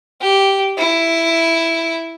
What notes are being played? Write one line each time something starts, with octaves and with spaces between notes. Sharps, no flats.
G4
E4